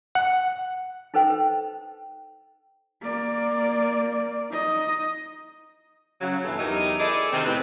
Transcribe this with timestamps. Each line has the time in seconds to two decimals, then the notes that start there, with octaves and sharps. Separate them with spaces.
0.15 F#5
1.14 D#4 A4 B4 C5 G5
3.01 A#3 D5
4.50 D#4 D#5
6.21 C#3 F#3
6.44 G2 B2 E3 A4
6.59 E2 F#3 D#4 E4 G4 A#4
7.00 E4 G#4 A4 D5 D#5
7.33 C3 D#3 C4
7.45 A2 C4 B4